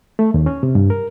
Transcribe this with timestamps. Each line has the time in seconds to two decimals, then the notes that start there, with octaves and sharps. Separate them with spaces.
0.19 A3
0.34 D#2
0.46 C#4
0.63 C3
0.75 G2
0.90 A#4